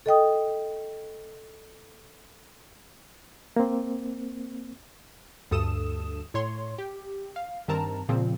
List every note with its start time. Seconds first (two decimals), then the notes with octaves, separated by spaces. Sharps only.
0.06 A4 D#5 G5 D#6
3.56 A#3 C4
5.51 D2 G2 A4 D#6 E7
6.34 A2 C#5 C6
6.78 G4
7.36 F5
7.68 G2 D#3 C4 A#4 A5 A#5
8.09 A#2 C#3 F3 C4